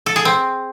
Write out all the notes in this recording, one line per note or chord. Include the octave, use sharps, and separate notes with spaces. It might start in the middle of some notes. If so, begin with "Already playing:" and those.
A4
G#4
C4